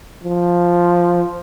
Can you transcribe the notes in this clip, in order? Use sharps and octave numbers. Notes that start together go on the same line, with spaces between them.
F3